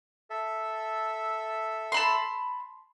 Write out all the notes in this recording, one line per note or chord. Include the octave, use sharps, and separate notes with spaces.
A4 E5
A5 B5 C6